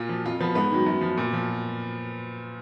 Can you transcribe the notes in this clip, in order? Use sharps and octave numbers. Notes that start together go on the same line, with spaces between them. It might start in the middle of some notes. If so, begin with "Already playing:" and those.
Already playing: A#2 F4
F3
F2 F4
F3 B3
G#2 B3
D#3 F#3
F#2
F3
A#2
F3